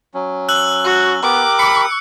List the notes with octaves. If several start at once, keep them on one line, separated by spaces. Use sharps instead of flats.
F#3 C#4
E6 F#6 F#7
F#4
B3 G4 A#4 D6
B5 C#7